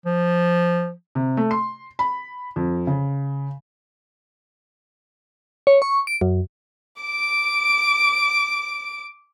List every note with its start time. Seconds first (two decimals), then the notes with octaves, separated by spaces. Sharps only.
0.06 F3
1.15 C3
1.37 A3
1.51 C6
1.99 B5
2.56 F2
2.87 C#3
5.67 C#5
5.82 C#6
6.07 D7
6.21 F#2
7.02 D6 D7